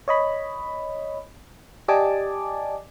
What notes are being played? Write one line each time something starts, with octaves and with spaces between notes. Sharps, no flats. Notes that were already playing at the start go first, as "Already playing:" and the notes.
C#5 D#5 B5
G4 D5 D#5 G#5 A5 D6